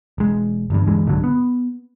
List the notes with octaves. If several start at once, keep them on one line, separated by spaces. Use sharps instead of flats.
E1 G#3
G1 E2 G2
G2 E3 G#3
C2 G#2 D3 F#3
B3